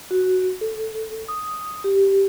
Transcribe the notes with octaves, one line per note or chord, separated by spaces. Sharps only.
F#4
A4
D#6
G4